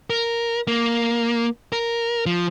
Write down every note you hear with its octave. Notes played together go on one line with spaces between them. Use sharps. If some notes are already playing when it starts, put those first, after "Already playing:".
A#4
A#3
A#4
F3